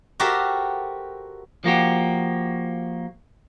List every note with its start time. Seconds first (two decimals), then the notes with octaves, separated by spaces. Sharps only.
0.20 F#4 G4 A4 A#4 C5 E5
1.64 F3 A#3 F#4 G4